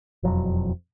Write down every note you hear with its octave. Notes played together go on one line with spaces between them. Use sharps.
E1 F2 F#3